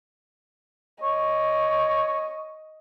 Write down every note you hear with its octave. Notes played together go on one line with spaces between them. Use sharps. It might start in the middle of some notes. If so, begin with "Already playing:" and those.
C#5 D#5